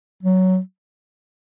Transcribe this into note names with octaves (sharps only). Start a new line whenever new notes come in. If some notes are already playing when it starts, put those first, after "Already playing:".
F#3